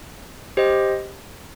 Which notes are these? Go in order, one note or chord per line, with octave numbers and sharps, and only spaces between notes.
G4 C5 D#5